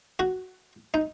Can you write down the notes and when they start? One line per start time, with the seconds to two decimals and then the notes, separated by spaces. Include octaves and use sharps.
0.19 F#4
0.94 D#4